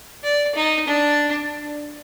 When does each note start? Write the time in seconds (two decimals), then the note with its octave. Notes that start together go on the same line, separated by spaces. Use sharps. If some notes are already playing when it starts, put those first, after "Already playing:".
0.24 D5
0.55 D#4
0.87 D4